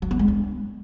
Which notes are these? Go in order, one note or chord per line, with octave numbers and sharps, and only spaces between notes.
F#3
B3
G#3
D4